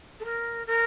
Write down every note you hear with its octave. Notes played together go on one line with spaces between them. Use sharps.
A4
A#4
A#4